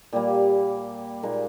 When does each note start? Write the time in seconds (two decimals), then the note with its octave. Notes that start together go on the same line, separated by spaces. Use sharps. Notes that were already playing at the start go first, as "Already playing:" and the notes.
0.13 A#2 G3 A#3 G4
1.23 A#2 G#3 D#4 A#4